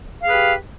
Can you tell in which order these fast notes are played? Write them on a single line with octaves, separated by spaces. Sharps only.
F5 G#4 B4 G4